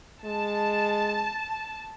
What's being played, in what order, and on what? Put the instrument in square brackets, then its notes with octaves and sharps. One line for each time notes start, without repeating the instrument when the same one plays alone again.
[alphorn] G#3 [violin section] A5